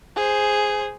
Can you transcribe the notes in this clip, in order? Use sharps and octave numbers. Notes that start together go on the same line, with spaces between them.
G#4 C5